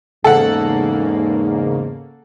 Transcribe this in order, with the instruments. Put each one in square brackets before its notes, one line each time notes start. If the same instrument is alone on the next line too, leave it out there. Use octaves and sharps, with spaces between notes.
[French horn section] E2 G#2 [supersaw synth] C#3 A#3 [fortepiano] A4 F#5